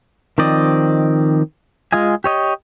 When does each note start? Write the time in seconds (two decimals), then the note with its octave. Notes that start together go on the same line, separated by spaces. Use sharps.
0.38 D#3 F3 C4 D5 D#5
1.92 G#3 F4 D#5 G#5
2.24 G4 C#5 D#5